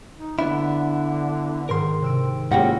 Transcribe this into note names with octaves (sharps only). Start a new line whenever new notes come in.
D#4
D3 B3 D4 E4
G#2 D#3 A#4 C6
C3 E6 D7
G#2 C#3 A#3 E4 F4 G4 F#5 A#6